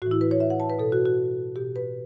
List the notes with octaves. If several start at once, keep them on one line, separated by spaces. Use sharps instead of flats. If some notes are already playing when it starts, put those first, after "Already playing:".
A2 E3 F#4
E4
B4
C#5
E5
F#5
A5
B4
B2 A4
F#4
F#4
B2 G4
B4